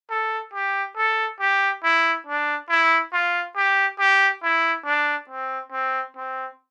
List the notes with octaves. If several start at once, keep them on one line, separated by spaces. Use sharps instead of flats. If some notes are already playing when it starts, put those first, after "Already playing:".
A4
G4
A4
G4
E4
D4
E4
F4
G4
G4
E4
D4
C4
C4
C4